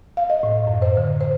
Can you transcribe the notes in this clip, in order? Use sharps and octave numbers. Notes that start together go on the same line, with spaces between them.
F5
D#5
A2
F#2
C5
D3
C5